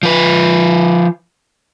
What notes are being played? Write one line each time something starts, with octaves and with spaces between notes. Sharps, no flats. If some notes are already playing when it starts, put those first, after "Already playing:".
F3 B4